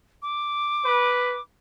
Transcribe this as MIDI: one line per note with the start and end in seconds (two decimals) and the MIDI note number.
0.22 1.41 86
0.85 1.37 71